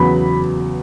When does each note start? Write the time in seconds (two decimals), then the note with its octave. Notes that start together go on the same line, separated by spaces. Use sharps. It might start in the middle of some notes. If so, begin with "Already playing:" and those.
Already playing: E2 C#3 F#3 B3 B5